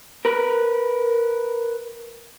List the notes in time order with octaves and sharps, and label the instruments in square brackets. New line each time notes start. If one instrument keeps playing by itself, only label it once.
[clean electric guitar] A#4 B4